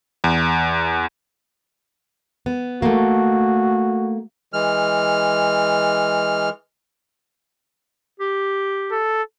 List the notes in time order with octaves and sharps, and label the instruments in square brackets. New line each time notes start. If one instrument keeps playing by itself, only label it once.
[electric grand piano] E2
[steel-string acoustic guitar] B3
[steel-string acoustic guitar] A3 A#3 [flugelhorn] F#4
[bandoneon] E3 G#3 F6
[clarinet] G4
[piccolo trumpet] A4